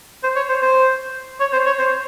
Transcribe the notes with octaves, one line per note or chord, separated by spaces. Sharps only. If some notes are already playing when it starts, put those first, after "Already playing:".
C5
C#5
C5
C5
C#5
C5
C#5
C5